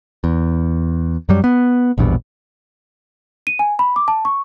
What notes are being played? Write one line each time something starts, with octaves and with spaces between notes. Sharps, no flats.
E2
F#2 F#3 G3
B3
A#1 E2 G2 B2
D#7
G#5
B5
D6
A5
C#6